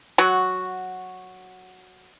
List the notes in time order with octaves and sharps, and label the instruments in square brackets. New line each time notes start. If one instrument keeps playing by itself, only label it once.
[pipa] F#3 F#4